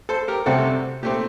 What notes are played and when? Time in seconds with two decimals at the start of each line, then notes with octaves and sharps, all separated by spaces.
0.09 A4 C5
0.28 G4 A#4
0.46 C2 C3 G3 C4 F#4 A4
1.03 A#2 A3 C4 G4